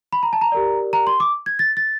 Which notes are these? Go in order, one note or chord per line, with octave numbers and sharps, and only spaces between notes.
B5
A#5
A5
A#5
G4 A#4 D5
A#5
C6
D6
G#6
A6
A6